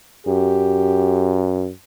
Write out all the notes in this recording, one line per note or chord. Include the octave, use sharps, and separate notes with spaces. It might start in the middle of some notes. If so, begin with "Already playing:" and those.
F#2 G4